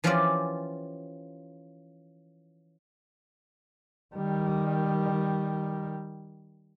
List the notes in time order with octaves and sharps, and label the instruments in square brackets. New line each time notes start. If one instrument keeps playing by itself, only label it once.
[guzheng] E3 F3 C#4 F4 G4 D5
[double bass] D#3 G3